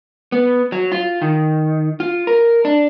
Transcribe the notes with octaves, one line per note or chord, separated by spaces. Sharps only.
B3
F#3
F4
D#3
F4
A#4
D4